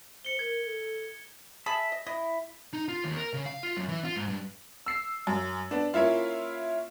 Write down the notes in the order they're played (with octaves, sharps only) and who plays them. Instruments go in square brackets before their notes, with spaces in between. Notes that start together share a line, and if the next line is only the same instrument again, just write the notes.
[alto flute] C5 [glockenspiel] C#7 G7
[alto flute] A#4 [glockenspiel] G#6
[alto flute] A4
[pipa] G#4 A5 B5 [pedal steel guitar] E5
[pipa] D#5
[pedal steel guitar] E4 [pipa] D#5
[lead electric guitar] D#4
F4
D#2
A#4
C#3
F5
F4
F#2
E3
F4
G#2
G2
[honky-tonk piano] E6 C7
F#2
B3 D4
A#3 C#4 E4 F4